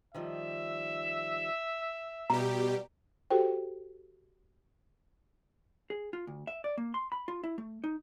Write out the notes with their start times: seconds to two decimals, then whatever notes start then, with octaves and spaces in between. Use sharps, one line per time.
0.14 D#3 F3 G3 E5
2.30 B2 G3 G4 A#5
3.30 F#4 G4 A4 C5 G5
5.90 G#4
6.13 F4
6.27 D2
6.47 E5
6.64 D5
6.78 A#3
6.94 C6
7.12 B5
7.28 F4
7.44 E4
7.58 A3
7.84 D#4